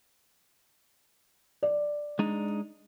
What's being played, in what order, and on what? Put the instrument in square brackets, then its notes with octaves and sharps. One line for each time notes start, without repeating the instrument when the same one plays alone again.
[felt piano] D5
[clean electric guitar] G#3 D4 D#4